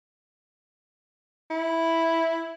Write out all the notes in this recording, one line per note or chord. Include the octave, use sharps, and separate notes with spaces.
E4